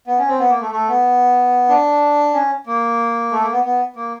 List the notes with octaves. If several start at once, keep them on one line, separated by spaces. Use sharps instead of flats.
B3
C#4
C4
B3
A#3
A3
A3
B3
D4
C#4
A#3
A3
A#3
B3
B3
A#3